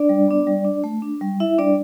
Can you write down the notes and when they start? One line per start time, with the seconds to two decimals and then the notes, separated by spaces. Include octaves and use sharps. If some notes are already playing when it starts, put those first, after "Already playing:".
Already playing: D4 D5
0.09 G3
0.28 B3 D4
0.47 G3
0.65 D4
0.84 A3
1.02 D4
1.21 G3
1.40 E4 E5
1.58 G3 D4 D5